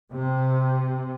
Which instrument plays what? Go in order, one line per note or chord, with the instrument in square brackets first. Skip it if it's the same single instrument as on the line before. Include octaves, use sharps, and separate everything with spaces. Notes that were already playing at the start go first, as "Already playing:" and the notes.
[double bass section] C3